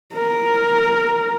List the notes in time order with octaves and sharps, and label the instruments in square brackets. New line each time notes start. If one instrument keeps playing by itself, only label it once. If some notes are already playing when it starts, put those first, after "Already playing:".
[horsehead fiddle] A#4